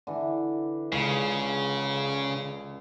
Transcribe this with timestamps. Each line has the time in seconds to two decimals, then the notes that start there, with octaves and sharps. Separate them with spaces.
0.07 D3 E3
0.92 C#2 C#3